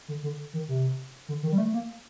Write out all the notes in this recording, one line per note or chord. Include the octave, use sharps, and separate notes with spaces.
D3
D3
D#3
C3
D3
D#3
G3
A3
A#3